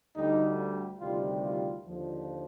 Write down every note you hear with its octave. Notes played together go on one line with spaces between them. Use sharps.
D2 D3 G3 D#4
D2 C3 D#3 G3 F4
F4
D#2 D3 F3